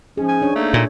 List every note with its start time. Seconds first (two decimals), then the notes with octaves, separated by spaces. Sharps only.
0.17 G#2 F3 C#4 G#4
0.29 G#5
0.42 D4 C#5
0.55 A3 A#3 D#4
0.74 A#2